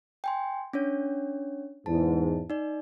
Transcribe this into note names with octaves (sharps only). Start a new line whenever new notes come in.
G5 G#5 C6
C#4 D4 C#5
E2 G#2 A5
D#4 D5